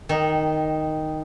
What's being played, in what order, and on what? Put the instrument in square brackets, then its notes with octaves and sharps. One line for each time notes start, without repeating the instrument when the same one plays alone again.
[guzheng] D#3 [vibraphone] G5 D#6